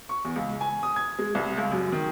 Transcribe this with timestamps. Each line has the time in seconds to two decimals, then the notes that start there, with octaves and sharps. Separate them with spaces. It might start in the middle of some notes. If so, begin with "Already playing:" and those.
0.09 C#6
0.25 E2
0.36 C#2
0.61 G#5
0.83 D#6
0.96 G#6
1.19 G#3
1.35 C2
1.58 C#2
1.72 F#2
1.92 D#3